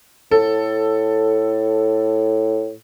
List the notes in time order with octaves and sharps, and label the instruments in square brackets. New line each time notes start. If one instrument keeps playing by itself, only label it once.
[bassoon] A2 [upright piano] A4